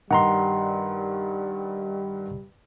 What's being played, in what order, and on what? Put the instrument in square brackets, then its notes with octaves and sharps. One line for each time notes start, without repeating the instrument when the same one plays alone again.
[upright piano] G2 D#3 [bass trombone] G3 [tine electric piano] F#5 A#5 C6